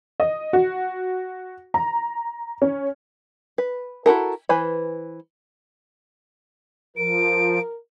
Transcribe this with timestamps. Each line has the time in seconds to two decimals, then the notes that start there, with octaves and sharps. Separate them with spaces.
0.20 D#5
0.53 F#4
1.74 A#5
2.62 C#4
3.58 B4
4.06 E4 F#4 A4 A#4
4.49 E3 B4 C5 G#5 B5
6.97 F3 A#4 D7